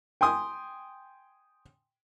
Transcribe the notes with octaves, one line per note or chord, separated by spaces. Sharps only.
G5 G#5 C6 D#6